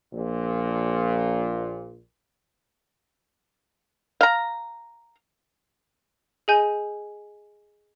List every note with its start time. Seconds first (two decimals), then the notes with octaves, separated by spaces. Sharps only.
0.13 A#1 A#2
4.21 F5 A#5
6.48 G#4 D#5 G#5 G6